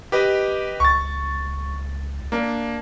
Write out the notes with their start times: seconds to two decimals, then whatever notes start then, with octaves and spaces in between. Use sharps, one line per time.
0.12 G4 B4 D#5
0.80 C#2 C#6 A6
2.32 A#3 D4